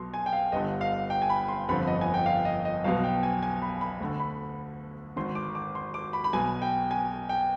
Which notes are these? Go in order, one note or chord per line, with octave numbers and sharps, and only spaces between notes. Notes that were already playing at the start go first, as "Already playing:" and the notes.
Already playing: B1 B2 C6
G#5
G5
F5
G1 G2 D3 D#5
F5
G5
G#5
B5
C6
G1 F2 D3 B5
D#5
G#5
G5
F5
D#5
D#5
B1 B2 F5
G5
G#5
G#5
B5
B5
D2 D3
B5
G#1 G#2 D#3 C6
D6
D6
C6
D6
B5
B5
B1 B2 G#5
G5
G#5
G5